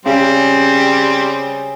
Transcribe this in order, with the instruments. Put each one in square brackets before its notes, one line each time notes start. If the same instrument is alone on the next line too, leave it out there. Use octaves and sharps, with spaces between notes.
[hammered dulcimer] C#3 G#4 [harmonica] G3 C4